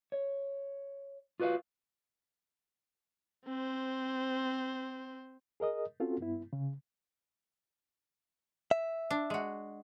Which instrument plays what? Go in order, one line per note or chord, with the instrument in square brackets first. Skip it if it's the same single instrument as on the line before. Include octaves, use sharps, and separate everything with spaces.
[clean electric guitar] C#5
F4 F#4 B4 D5 F5
[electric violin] C4 C5
[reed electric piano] G#4 A#4 D#5 D#6
C4 C#4 F4 F#4 A4
G2 B3 E4
C#3
[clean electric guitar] E5
[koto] D4
G#3 F#4